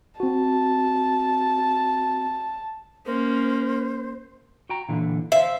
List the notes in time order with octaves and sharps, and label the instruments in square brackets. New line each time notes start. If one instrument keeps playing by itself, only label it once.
[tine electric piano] C4 F#4 [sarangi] A5
[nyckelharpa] A#3 C#4 [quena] C5
[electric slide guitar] F#4 G5 A#5
A#2 D3 E3
[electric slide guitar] C5 F5 [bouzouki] E5